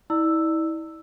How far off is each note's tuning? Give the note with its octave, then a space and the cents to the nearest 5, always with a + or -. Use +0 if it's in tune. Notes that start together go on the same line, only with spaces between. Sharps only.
E4 -35 D5 +20 E6 +0